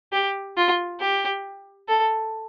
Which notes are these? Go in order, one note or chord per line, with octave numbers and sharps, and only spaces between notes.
G4
F4
G4
A4